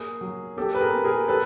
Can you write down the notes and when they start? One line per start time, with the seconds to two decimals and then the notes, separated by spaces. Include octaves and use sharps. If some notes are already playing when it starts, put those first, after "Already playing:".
Already playing: A#3 G#4
0.21 F#3
0.57 A#3 G4 A4
0.75 B4
0.81 G#4 A#4
0.92 A#3
1.04 G#4 A#4
1.28 G3 A4 B4